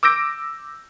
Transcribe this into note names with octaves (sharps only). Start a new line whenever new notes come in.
D6 E6 G6 A#6 D7